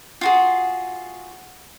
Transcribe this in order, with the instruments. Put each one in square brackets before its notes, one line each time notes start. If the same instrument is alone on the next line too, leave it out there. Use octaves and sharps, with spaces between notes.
[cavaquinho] F4 F#4 G#4